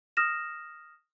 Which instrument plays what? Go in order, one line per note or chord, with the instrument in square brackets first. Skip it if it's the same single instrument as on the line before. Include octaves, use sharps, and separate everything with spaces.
[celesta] D#6 F6 A#6 E7